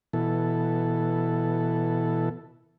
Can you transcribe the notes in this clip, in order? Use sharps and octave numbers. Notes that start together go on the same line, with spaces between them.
B2 E3 A4